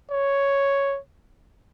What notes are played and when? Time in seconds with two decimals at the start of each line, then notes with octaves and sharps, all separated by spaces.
0.11 C#5